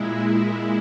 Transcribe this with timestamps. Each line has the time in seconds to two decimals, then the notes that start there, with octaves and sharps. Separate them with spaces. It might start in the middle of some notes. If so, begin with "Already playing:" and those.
Already playing: A#2 G#3 E4